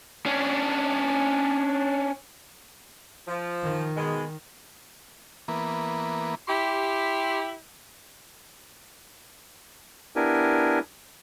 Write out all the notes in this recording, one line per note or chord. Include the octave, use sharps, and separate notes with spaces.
C#4 D4
F3
D#3
B2 G#3
E3 A#3 B3
E4 G4 C6
B3 D4 E4 G4 A#4 G#5